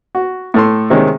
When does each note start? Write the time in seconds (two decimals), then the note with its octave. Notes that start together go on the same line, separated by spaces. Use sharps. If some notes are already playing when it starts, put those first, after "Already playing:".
0.15 F#4
0.54 A2 A4 C6
0.90 C3 D#3 G#3 C#4